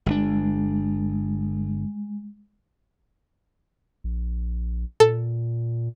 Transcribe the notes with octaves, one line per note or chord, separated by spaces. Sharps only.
G1 C3 G#3 D4
A#1
A#2 A4